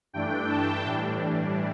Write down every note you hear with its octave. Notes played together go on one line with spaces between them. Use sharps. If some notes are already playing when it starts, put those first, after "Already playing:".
G2 E3 A3 D4 G5
A5
A2 E3 G3 D4